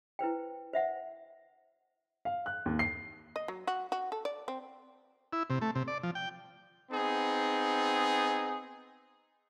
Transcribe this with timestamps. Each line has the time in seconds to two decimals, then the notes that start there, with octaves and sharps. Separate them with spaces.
0.19 E4 B4 C5 G5
0.73 C5 E5 F#5
2.25 F5
2.46 F#6
2.66 D#2
2.79 C7
3.36 D#5
3.48 F#3
3.67 F#4
3.92 F#4
4.12 A4
4.25 D5
4.48 C4
5.33 E4
5.50 C3
5.62 A3
5.75 C3
5.88 D5
6.03 F3
6.15 G5
6.91 B3 C4 D#4 G#4